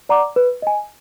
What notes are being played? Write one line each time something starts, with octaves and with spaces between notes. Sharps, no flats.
D5 F#5 A#5 D6
B4
D#5 G#5